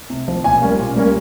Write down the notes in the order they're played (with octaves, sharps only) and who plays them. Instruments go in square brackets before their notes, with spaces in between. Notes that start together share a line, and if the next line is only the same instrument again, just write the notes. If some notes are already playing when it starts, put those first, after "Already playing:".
[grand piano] C3
F3 C4
A#2 G#5
G3 A#3 C#4
A#2
G3 A#3 C#4